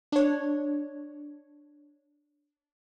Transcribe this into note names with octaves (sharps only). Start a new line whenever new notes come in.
D4 C#5